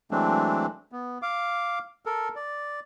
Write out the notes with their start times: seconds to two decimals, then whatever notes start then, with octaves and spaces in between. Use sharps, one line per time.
0.11 E3 F#3 G#3 A3 C4 D4
0.92 B3
1.22 F5 D6
2.06 A4 A#4
2.36 D5